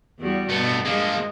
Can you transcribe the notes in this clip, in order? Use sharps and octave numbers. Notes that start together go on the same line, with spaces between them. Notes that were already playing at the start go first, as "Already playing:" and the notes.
E2 G3 F#4
G2 B2 A3 B3
F3 G#3 A#3